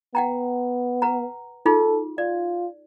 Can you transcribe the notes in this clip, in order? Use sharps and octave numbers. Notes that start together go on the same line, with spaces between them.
B3 F#5 G5 A#5
B4 F#5 A#5
D#4 F4 G#4 A4
F4 D5